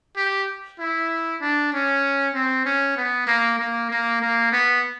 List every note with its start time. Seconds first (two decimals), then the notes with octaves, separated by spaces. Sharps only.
0.17 G4
0.79 E4
1.41 D4
1.73 C#4
2.34 C4
2.65 C#4
2.96 B3
3.27 A#3
3.59 A#3
3.90 A#3
4.21 A#3
4.52 B3